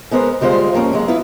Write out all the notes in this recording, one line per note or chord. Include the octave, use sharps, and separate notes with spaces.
G#3 B3 A#4 C5
D2 G3 G#3 F4 C5
G2 F3 A#3 C#4
F#3 G#3
B3 E4 F4 B4